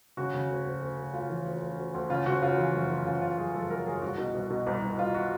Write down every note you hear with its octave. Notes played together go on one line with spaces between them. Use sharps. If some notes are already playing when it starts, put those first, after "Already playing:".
C#3 F#4
C#3
D2
D2
D2
D2
D2 F4
E3
D2
D2
D2
D2
C#3 F4
C#3 F#4
C#3 F4
E3
F#2
E3
C#3 F4
C#3 F4
F#2 G#4
F#2 A4
F#2 A#4
F#2 G#4
C2 F#4
B2
C2
B2
C2
C2
C2 F4
F#4